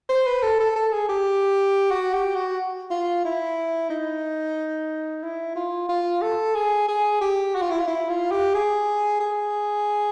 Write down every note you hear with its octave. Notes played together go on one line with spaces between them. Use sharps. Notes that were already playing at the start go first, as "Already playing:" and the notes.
C5
B4
A4
A4
A4
G#4
G4
F#4
G4
F#4
F4
E4
D#4
E4
F4
F4
A4
G#4
G#4
G4
F#4
F4
E4
F4
E4
F4
G4
G#4
G#4